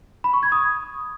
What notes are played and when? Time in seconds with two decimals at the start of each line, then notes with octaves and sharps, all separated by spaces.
0.24 B5
0.33 C#6
0.43 G#6
0.52 D#6